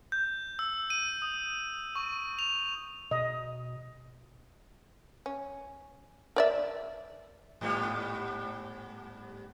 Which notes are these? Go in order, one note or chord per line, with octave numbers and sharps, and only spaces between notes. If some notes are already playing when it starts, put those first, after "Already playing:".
G6
E6
D#7
D#6
C#6
F7
B2 D#5
C#4
A#4 D5 E5
G#2 G3 B3